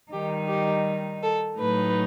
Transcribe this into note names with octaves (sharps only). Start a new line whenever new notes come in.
D#3 G3 D#4 G4
G4
A4
A2 F#3 A3 D#4 B4